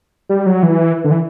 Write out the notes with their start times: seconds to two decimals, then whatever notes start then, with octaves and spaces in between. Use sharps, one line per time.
0.29 G3
0.46 F#3
0.63 E3
1.04 D3
1.11 E3